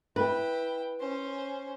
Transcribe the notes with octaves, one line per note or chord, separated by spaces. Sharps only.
E4 B4 G5
C#4 C5